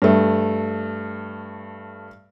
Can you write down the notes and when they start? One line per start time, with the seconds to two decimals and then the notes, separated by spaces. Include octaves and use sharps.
0.02 G2 A3